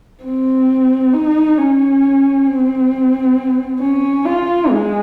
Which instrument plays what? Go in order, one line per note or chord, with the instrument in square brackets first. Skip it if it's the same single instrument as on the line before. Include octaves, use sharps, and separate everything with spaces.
[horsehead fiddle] C4
D#4
C#4
C4
C#4
F4
G#3